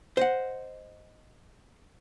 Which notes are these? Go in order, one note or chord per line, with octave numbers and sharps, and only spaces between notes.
C5 D#5 F#5